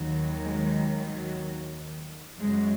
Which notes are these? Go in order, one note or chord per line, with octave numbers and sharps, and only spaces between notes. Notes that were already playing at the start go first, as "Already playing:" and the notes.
Already playing: D#2 D#3 F#3
G#3
F#3
F#2 C#3 F#3 G#3